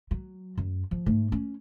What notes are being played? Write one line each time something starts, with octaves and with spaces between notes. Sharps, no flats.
F#3
F#2
F3
G#2 A3
C#4